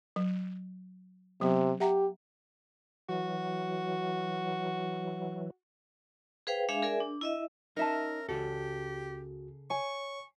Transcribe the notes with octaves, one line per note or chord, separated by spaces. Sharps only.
F#3
C3 F#3 B3
G4 E5 F#5 A#5
E3 F#3 F#4
G#4 B4 C5 F5 G5
G#3 D4 G#4 E5 F5 G#5
G#4 A#4 D5 E5 G#5
D4
E4 D#5 E5
C#4 D#4 A#4 E5 A5
C#2 C#3 F#4 G4 A4
C#5 G#5 C#6